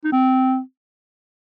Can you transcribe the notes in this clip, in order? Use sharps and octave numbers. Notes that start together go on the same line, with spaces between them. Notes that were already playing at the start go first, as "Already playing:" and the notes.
D#4
C4